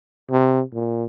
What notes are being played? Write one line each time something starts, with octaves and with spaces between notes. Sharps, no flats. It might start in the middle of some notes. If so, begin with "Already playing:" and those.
C3
A#2